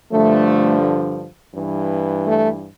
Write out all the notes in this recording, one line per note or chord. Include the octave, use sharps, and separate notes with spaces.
G2 D3 F3 A3
G2 E3
A3